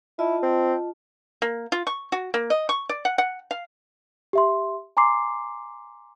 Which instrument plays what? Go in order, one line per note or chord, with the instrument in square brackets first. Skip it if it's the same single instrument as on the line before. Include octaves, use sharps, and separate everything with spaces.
[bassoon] E4 [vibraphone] F4 D#5 A5
[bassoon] C4
[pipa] A#3
F4
C#6
F#4
A#3
D#5
C#6
D5
F#5
F#5
F5
[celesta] G4 E5 C6
G#5 A#5 C6 D6 C7